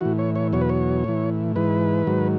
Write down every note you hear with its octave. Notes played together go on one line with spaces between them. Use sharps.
A2 E3 F#4
C#5
C#5
E2 B2 F#3 C#5
B4
C#5
A2 E3
G#2 E3 B4
G#2 D#3 F#3